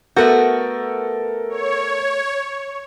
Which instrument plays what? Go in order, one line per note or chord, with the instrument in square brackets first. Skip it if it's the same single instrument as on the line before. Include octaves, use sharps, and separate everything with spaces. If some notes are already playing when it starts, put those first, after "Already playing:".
[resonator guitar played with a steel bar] A3 B3 F#4 [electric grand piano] A4 A#4 G6
[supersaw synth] C#5